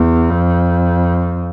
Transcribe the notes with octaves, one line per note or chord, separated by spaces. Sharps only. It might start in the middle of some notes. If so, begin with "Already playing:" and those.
Already playing: E2
F2